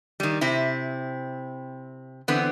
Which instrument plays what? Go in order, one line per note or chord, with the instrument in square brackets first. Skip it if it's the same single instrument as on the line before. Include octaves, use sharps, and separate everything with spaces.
[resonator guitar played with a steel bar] D#3 G3
C3 C4 E4
D3 E3 B3 C4